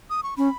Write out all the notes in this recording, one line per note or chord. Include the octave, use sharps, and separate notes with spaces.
D#6
C#6
C#4 B5